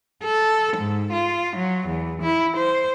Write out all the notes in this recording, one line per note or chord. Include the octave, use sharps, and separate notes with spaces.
A4
G#2
F4
F#3
E2
E4
C5